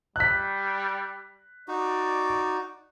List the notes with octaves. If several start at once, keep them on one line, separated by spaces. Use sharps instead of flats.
G3 F#6 B6
D#4 F#4 D5